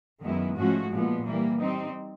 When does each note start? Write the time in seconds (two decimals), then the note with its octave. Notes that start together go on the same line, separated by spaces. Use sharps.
0.23 F#2 D#3 G#3 B3 E4
0.57 G#2 F3 A3 C#4 F#4
0.92 A#2 F3 G#3 B3
1.25 E3 G3 A#3
1.59 G3 C4 D#4